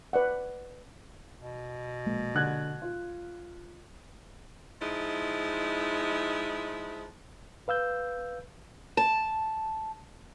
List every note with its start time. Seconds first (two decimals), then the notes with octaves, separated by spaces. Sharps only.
0.13 B4 D5 F#5
1.38 B2
2.06 A#1 G#3 A#3
2.35 D3 F#6 G#6
2.82 F4
4.82 F3 G#3 D#4 E4
7.68 B4 F5 E6 G6
8.97 A5